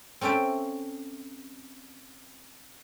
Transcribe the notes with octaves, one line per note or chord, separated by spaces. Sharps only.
C4 C#4 A4 E5 G5